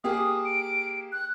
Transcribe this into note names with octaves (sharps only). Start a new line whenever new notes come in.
A#3 G4 G#4 D#6
D7
F#6